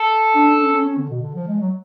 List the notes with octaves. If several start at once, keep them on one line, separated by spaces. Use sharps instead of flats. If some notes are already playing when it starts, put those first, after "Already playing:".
Already playing: A4
D4
D4
C#4
C#4
C#4
D3
B2
D3
F3
G#3
F#3